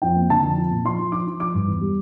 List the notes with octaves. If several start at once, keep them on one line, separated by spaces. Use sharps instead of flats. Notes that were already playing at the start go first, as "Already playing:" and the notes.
F2 G5
A#3
D3 A5
F2
F3
A#2
F3 C6
F3
F3 D6
F3
F3 D6
G2
E2
G3